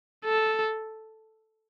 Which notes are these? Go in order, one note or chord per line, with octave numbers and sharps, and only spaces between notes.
A4